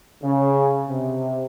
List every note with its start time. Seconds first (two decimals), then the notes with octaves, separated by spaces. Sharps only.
0.23 C#3
0.88 C3